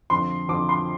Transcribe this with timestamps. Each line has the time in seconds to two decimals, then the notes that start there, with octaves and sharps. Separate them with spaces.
0.10 F2 D3 F3 C6
0.49 F2 D3 F3 D6
0.69 C6